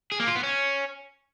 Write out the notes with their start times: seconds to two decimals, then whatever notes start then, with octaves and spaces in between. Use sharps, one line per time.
0.12 G#4
0.20 A#3
0.28 F4
0.35 B3
0.43 C#4